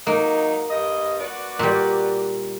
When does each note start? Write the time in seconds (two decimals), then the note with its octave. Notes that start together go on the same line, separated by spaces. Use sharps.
0.07 F#3 G#3 A#3 D#4
0.70 G2 D#5
1.20 F#4 B4 D5
1.59 A#2 G3